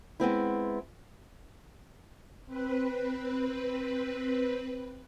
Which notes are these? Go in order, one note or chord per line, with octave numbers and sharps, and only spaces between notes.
G#3 B3 C4 E4
C4 B4